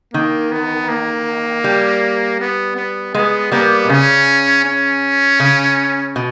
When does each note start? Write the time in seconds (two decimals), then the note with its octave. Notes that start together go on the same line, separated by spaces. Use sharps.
0.13 D#3 A#3
0.52 B3
0.89 A#3
1.64 G3
2.40 B3
2.76 B3
3.15 G#3 B3
3.52 G3 A#3 B3
3.85 B2
3.89 C#3 C#4
4.65 C#4
5.40 C#3
6.16 B2